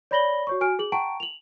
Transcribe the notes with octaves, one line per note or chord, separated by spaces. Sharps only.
C#5 D5 B5 A#6 F#7 G7
F#4 C#5 C#6
F#4 G#5 F6 D7
G#4 F#7
F#5 G5 A5 A#5 C#6 D7
F7 F#7